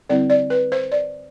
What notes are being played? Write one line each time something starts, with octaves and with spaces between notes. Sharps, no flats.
D3 G3 C4 E4 D5
D5
B4
C5
D5